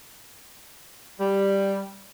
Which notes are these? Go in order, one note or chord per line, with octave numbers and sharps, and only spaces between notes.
G3